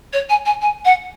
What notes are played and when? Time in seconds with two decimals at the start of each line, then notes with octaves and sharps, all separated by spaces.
0.13 C#5
0.29 G#5
0.45 G#5
0.61 G#5
0.85 F#5